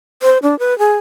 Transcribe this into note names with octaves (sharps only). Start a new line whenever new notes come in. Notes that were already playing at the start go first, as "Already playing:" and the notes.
C5
D4
B4
G#4